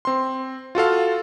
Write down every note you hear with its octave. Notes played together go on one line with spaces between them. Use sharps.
C4 C6
F4 F#4 A4 F5